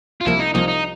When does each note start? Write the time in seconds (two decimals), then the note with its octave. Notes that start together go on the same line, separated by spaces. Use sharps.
0.21 F4
0.25 C2 C3 F3 A#3 E4
0.40 D#4
0.54 C2 C3 F3 A#3 D#4
0.68 D#4